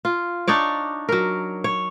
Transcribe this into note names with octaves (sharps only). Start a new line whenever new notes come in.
F4
D4 D#4 C#5 D5
F#3 A#4
C#5